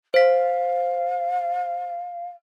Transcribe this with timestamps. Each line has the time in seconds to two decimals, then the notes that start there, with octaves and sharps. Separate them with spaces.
0.14 C5 F5 B6